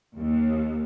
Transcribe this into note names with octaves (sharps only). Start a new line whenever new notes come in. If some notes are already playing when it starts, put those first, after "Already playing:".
D#2